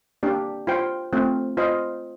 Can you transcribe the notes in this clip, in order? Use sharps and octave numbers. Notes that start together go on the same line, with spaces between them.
A#3 D4 G4 D5
F4 C5 G5
A3 C4 F4
F4 C5 D#5